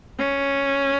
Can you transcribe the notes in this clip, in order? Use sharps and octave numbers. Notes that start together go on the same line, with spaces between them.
C#4